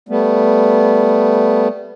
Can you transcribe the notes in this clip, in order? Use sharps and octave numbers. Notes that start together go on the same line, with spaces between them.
G3 A3 B3